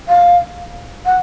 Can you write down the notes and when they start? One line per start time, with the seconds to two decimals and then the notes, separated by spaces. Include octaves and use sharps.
0.08 F5
1.06 F#5